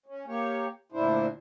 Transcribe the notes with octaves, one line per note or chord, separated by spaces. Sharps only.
C#4
A#3 G4 C#5
D2 A#2 D4 E4 C5